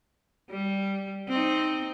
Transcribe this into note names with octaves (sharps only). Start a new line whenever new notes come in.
G3
C4 D#4